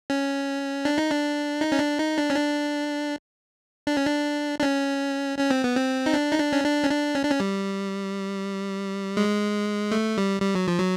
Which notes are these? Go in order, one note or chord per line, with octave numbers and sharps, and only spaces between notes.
C#4
D4
D#4
D4
D#4
C#4
D4
D#4
D4
C#4
D4
D4
C#4
D4
D4
C#4
C#4
C4
B3
C4
D#4
D4
D#4
D4
C#4
D4
C#4
D4
C#4
D4
C#4
G3
G#3
A3
G3
G3
F#3
F3
F#3